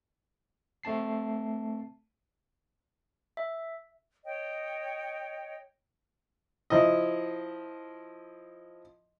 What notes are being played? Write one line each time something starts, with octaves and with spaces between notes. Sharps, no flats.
A3 C4 A5 C7
E5
C#5 D#5 G5
F3 E4 D#5